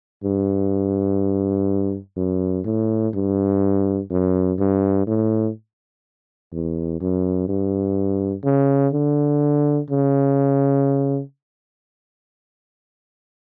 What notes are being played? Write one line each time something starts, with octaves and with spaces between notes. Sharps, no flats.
G2
F#2
A2
G2
F#2
G2
A2
E2
F#2
G2
C#3
D3
C#3